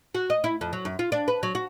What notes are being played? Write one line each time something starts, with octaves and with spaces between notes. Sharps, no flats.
F#4
D#5
E4
F2
F#3
F#2
F4
D4
B4
F#3
F#4